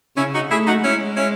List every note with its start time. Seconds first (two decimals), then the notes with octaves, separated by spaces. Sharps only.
0.17 C#3 C#4 E4
0.33 D#4 F#4
0.50 A3 E4 G#4
0.67 D#4 F#4
0.84 G#3 C#4 E4
1.17 C#4 E4